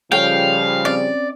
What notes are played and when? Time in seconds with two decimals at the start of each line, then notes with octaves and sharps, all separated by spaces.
0.12 C#3 F3 G3 A4 C#5 F5 G5
0.85 C4 C#4 D5